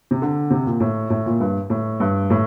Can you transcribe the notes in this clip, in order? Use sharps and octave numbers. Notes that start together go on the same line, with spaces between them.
C3
D3
C3
A#2
A2
A2
A#2
G2
A2
G2
A2